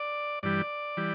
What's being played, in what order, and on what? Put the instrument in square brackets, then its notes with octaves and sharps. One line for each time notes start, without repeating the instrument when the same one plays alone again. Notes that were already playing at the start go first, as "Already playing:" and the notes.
Already playing: [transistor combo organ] D5
G2 E3 G3 D5
E3 G3